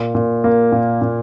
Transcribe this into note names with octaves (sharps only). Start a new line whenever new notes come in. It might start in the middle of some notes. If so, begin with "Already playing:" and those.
Already playing: A#2
A#2
A#3
A#2
A#2